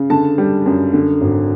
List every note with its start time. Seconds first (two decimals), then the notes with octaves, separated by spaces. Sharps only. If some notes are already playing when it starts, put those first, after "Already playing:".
Already playing: C#3
0.10 D3 A5
0.38 G3
0.66 F#2
0.93 D3
1.21 G#1